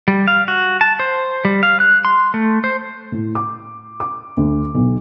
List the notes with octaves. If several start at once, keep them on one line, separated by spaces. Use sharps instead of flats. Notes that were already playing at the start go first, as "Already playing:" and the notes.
G3
F5
F#4
A5
C5
G3
F5
F#6
C6
A3
C5
A2
D6
D6
D2
B1